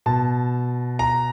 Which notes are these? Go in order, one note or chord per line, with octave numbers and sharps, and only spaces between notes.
B2 A5
A#5